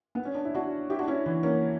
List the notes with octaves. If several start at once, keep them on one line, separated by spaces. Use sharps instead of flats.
B3
C#4
D4
E4
D4 F#4
E4 G4
D4 F#4
C#4 E4
E3
A#3 C#4